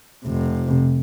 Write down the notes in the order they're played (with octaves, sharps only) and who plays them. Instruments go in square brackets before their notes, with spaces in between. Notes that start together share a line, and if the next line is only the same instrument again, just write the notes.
[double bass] F1 C3